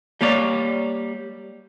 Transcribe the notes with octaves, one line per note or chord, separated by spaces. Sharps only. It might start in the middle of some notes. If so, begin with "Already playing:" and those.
G3 A#3 C#5 D5